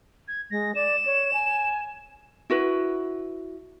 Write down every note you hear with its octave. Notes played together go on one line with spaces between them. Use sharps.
G#6
G#3 A#6
D5 E7
C#5
G#5
E4 F#4 B4